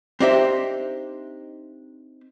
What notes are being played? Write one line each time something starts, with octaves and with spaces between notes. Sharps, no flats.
C4 D4 D#4 G4 C5 E5